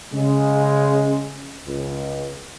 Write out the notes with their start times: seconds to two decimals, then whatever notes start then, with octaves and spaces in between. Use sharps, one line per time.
0.14 C#3 G#3
1.67 C#2